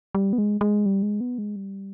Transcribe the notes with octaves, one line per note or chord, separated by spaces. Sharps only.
G3
B3
G#3
G#3
G3
G#3
B3
G#3
G3